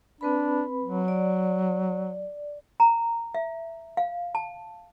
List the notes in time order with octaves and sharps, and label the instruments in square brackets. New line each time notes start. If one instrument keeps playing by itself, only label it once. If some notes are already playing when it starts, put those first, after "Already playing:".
[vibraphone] C4 B4 B5 [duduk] D4
[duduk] F#3
[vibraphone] D5
[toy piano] A#5
E5
F5
A5